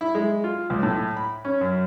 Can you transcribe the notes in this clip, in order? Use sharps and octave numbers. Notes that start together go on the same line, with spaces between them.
E4
G#3
F4
C#2
A2
B5
C#4
F#2